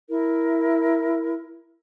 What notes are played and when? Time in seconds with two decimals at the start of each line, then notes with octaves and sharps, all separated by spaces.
0.09 E4 A#4